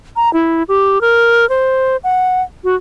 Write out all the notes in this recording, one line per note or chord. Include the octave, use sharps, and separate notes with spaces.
A#5
E4
G4
A#4
C5
F#5
F#4